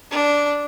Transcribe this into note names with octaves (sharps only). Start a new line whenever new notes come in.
D4